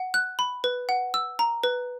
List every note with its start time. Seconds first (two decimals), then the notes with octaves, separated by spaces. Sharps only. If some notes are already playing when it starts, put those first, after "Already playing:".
Already playing: F#5
0.14 F#6
0.39 B5
0.64 B4
0.89 F#5
1.14 E6
1.39 A#5
1.64 B4